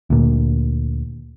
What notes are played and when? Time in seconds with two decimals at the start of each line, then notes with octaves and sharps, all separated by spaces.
0.10 D2 A#2